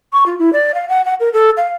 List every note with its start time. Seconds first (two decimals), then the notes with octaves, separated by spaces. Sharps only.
0.13 C#6
0.26 F4
0.39 E4
0.53 D5
0.75 F5
0.89 F#5
1.05 F#5
1.20 A#4
1.33 A4
1.57 F5